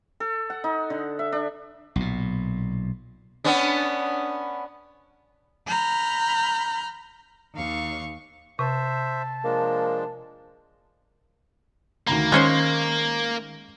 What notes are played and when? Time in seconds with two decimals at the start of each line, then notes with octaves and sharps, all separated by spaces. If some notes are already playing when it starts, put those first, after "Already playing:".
0.20 A4
0.50 F#5
0.64 D#4
0.90 D3
1.19 E5
1.32 D4
1.96 B1 A#2
3.44 B3 C#4 D4
5.67 A#5 B5 F6 G6
7.54 D#2 F5 C#6
8.59 C3 C5 E5 A5
9.44 F3 G#3 A#3 D4
12.07 D2 D#3 A#3 A#5 B5
12.32 D#3 G#3 C#4 C5 G6 G#6